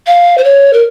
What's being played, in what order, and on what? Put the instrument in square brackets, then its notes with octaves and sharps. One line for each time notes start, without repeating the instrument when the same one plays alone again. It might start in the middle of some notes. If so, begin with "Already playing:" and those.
[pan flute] F5
C5
C#5
A#4